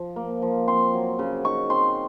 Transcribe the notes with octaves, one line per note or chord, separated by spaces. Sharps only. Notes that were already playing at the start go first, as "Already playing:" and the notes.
Already playing: F3
A#3
F3
C4 C6
F#3
C#3
D#4 C#6
C4 C6